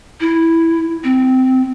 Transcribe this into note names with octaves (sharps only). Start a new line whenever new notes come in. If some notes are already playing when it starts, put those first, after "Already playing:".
E4
C4